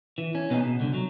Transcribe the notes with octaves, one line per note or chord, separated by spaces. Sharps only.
E3
C#4
B2 B3 D#4 G4 G#4
B2
C2 D3
F#3